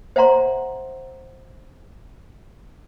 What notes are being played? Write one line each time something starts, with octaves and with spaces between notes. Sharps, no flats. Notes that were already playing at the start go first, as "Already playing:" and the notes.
C5 E5 F#5 A#5 C6